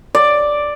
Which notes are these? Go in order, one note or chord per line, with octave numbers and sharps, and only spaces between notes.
D5